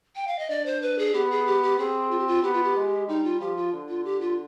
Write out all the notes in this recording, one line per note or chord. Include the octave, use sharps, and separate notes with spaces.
G5
F5
D#5
D4 D5
C5
B4
G#4
B3 G4
G#4
G4
G4
C4 G#4
F4
G4
F4
B3 G4
F4
G4
G#3
G3 D#4
F4
F3 G4
F4
D3
F4
G4
F4